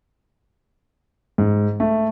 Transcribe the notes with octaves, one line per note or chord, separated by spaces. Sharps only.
G#2
A3